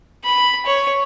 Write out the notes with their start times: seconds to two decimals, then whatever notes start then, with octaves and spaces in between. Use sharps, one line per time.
0.25 B5
0.66 C#5